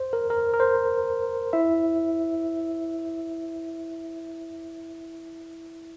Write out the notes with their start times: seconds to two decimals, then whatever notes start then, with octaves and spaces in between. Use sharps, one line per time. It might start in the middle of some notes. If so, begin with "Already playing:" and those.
Already playing: C5
0.13 A#4
0.30 A#4
0.53 A#4
0.60 C5
1.53 E4 E5